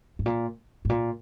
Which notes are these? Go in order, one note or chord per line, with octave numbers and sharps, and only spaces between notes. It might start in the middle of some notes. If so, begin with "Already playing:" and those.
G#2
A#2
G#2
A#2